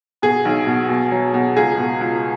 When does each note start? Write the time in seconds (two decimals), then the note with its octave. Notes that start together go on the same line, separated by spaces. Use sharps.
0.22 B2 G#4
0.45 B1
0.66 B2
0.89 B2
1.11 F#3
1.34 B2
1.57 C#2 G#4
1.78 B2
2.01 C#2